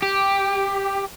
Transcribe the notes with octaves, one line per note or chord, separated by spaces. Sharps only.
G4